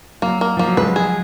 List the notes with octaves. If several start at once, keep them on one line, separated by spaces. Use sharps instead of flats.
F#3 A#3
A#3
F3 A#3
F#3
F3 G#3 B4
G#4